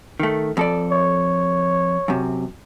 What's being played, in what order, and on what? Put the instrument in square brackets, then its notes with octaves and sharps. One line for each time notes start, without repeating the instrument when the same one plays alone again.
[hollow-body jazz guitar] D#3 A3
F2 A4 D5
[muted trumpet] C#5
[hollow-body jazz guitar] F#2 C3